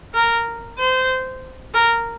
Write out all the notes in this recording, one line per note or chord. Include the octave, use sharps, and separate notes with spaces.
A#4
C5
A#4